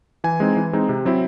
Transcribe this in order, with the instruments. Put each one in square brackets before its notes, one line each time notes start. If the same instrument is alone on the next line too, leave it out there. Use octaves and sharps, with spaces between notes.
[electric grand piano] E3 G#5
G#3 C4 D#4
E3
G#3 C4 D#4
C3
F#3 C4 E4